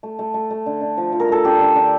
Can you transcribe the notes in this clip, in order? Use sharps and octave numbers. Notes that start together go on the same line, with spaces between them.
A3
A3
A3
A3
D3
D3
F3
F3
A#4
A3 A4
D3 G4
D3
D3